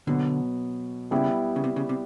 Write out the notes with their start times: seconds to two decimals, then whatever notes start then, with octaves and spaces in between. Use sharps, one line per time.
0.07 B2 D3 F#3 B3
1.11 C#3 G3 B3 E4 G4
1.56 C#3
1.64 C3
1.76 C#3
1.89 C3